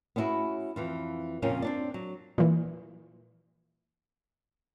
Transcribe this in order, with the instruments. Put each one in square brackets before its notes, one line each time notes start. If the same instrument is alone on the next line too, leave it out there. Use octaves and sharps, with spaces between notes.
[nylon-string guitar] B3 C#4 D4 E4 F#4 G#4
F2 E3 F4
F2 A#2 C#3 C#4 F4 A#4
C4 D4 D5
F#3
[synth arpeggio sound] A#2 E3